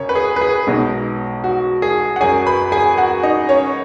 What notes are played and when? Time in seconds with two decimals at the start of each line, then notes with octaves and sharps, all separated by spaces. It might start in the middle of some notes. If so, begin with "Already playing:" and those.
Already playing: F#2 C#3 C#4 C#5
0.09 B4
0.15 G#4
0.36 B4
0.41 G#4
0.67 B1 B2 G#3 D#4
1.44 F#4
1.82 G#4
2.16 F#5
2.20 F#2 F#3 C#4 G#4 G#5
2.47 B4 B5
2.72 G#4 G#5
2.98 F#4 F#5
3.23 D#4 D#5
3.49 C#4 C#5